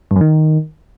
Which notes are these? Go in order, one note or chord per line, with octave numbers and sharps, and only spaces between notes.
G2
F#2
D#3